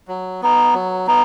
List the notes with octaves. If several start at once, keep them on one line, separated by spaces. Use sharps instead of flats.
F#3
B3 D#4
F#3
B3 D#4